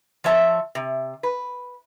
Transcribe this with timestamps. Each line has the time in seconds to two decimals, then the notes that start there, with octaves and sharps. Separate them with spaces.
0.24 F3 C#5 E5 A5
0.75 C3
1.23 B4